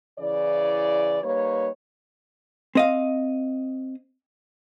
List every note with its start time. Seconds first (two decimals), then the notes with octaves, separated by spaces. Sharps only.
0.19 C#3 E3 E4 D5
1.23 G3 A#3 D#4 B4 C#5
2.75 C4 D#5 F5